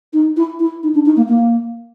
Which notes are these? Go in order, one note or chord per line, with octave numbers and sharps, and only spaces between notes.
D#4
E4
E4
D#4
D4
D#4
A#3
A#3